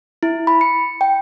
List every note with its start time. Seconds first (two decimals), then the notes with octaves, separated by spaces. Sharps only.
0.23 E4
0.47 B5
0.61 C#7
1.01 G5